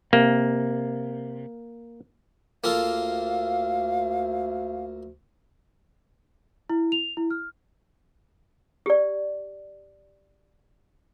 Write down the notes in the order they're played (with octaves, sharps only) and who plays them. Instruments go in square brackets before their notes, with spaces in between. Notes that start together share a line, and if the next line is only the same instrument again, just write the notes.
[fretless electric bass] C3 [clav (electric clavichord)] A#3
[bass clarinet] D2 [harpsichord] A#3 F4 A4 [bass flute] F5
[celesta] E4
F7
E4
F6
[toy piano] G4 D5